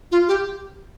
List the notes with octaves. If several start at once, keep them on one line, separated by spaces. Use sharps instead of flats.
F4
G4